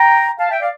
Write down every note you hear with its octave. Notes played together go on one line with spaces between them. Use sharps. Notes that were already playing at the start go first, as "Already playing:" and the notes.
Already playing: G5 A#5
F5 A5
E5 G5
D5 F5